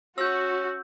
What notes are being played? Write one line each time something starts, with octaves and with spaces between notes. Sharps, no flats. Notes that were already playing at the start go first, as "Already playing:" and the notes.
C#4 F#4 E6 G6